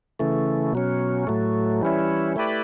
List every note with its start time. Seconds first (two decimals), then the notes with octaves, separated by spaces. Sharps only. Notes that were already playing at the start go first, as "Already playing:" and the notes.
0.19 C#3 E3 A3
0.73 B2 F#3 C#4
1.27 A2 F#3 A3
1.82 E3 G3 C#4 E4
2.36 A3 E4 G4 B4 D5